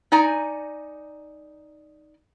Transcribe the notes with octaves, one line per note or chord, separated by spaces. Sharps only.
D#4 D5 G#5 A#5